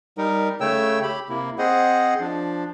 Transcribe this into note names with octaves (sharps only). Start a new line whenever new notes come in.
G3 D#4 A#4
C#3 A3 C#5 G5 E6
G4 B5
C3 A#3 E4
C4 G#4 C5 D#5 F#5
F3 D4